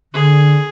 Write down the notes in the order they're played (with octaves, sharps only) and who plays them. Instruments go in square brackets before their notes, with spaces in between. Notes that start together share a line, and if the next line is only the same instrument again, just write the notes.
[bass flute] D3 [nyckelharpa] G#4